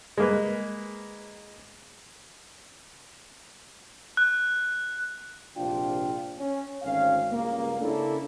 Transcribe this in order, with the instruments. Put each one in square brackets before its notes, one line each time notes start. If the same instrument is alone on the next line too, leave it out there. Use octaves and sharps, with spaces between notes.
[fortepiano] G#3 A#3 B4
[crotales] F#6
[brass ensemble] A#1 G#2 C3 D4 F4 G5
C#4
G#1 D2 C#4 F5
C#2 G2 C#3 A#3
C#3 A#3 C#4 D4 E4 A4